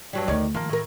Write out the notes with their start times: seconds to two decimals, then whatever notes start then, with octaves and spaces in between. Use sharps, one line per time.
0.13 G2 F#3 G3
0.28 D2 D#3 C#5 D5
0.54 D#3 F3 A#3
0.69 A2 A#4